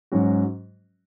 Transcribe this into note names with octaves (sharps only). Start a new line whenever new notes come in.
G#2 F#3 C#4 F#4